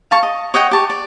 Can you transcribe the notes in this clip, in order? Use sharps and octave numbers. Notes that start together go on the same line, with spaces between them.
F5 A5 C#6
D#5
C#5 D#5 F#5 G5
G4 A5 C#6
D5